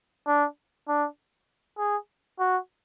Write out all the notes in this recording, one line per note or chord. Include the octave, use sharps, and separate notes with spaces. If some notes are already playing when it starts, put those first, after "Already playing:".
D4
D4
G#4
F#4